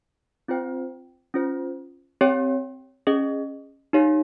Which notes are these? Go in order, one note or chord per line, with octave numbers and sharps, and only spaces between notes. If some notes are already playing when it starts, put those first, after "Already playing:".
C4 F4 C5 G5
C#4 F4 C5
C4 G4 C#5 G5
C#4 G#4 D#5
D#4 G4 C#5 F5